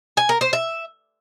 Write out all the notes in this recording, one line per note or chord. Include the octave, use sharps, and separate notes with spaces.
G#5
A#4
C5
E5